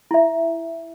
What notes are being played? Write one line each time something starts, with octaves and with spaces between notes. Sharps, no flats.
E4 E5